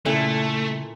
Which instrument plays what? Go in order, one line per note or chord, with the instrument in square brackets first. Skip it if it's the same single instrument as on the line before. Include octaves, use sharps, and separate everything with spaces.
[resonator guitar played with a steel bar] A#2 E4 A4 [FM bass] C#3 [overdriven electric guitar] A3